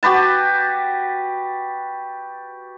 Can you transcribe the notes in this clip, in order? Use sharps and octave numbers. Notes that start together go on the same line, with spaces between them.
F#4 G4 B4 A5